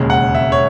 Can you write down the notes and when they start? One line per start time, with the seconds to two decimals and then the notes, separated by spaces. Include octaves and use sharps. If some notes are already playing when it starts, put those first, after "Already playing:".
Already playing: E1 D#2 C#3 G#3
0.10 F#5
0.35 E5
0.52 C#5